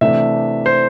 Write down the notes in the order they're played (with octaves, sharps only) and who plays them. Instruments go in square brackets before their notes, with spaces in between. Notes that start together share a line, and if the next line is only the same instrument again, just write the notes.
[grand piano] C3 E3 A3 D4 E5
C5